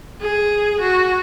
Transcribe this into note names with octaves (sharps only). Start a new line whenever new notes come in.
G#4
F#4